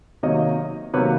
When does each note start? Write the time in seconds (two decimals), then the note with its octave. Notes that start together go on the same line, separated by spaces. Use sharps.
0.23 C3 D#3 F#3 A#3 C#5 D#5
0.94 C3 D#3 F#3 A#3 B4 C#5